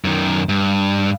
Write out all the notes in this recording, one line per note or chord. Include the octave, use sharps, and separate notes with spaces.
F#2 D#3
G2